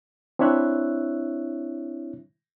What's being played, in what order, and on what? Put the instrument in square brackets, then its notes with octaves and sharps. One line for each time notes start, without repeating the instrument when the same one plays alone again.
[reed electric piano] C4 D4 E4 C#5 E5 F#6